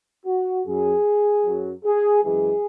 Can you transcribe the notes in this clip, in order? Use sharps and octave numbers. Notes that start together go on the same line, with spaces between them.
F#4
F#2 F#3 G#4
F#2 F#3
G#4
F#2 E3 G#3 G#4